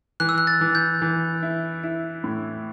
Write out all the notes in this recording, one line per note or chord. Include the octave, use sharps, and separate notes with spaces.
E3 F#6
E6
F#6
A6
E3
G6
E3
E4
E4
A2